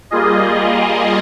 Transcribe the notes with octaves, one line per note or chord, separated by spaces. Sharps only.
G3 A#3 F4 G#4 D#5